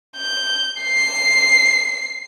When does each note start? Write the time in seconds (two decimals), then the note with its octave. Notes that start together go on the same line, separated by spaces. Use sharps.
0.17 G6
0.81 C7